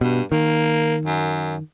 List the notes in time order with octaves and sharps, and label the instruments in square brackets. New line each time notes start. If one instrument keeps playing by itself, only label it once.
[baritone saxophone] G2 [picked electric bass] B2
[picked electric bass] D#3 [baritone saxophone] A#3
[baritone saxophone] F#2